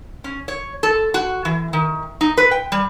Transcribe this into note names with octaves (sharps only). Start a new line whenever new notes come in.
C#4
C#5
A4
F#4
E3
D#3
D#4
B4
G5
G3